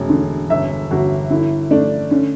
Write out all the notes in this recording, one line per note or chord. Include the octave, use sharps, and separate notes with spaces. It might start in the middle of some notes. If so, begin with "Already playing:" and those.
Already playing: E1 A1
D3
G1 E5
G1 F#4
D3 E4
A3 D4
D3 C#4